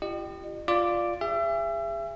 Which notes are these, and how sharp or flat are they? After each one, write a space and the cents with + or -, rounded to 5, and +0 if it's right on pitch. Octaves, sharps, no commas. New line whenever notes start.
E4 +45 G4 -10 D#5 -40
F4 +0 D5 +5 D6 +0
G#4 -35 E5 +35